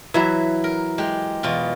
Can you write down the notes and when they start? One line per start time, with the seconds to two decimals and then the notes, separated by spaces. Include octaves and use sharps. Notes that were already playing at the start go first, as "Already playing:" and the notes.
0.14 E3 F#3 E4 E5
0.64 A#4
0.98 G#3 G4
1.43 E2 B2 F4